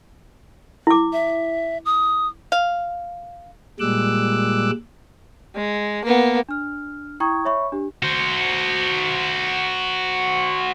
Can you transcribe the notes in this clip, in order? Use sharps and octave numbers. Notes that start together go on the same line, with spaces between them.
E4 D6
E5
D#6
F5
A#2 G3 G#3 D6 E6 F#6
G#3
A#3 B3
D4 F6
E4 G5 A#5 C#6 D#6 G#6
C#5 E5 B5 C#6
D4 G4
F#4 C5